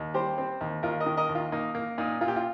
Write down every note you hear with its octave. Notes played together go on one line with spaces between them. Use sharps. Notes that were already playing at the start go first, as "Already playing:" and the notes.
Already playing: D#2
G3 G4 C5
C4
D#2
D#2 F4 A#4
A#4 D#5
D#3
A#4 D#5
D#2
F4
A#3 D#4
A#3
A#2 D#4
A#2 F4
G4
F4